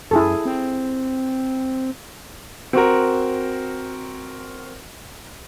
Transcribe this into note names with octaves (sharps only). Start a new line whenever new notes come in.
F#2 E4 G#4 A4
C4
C4 F#4 A#4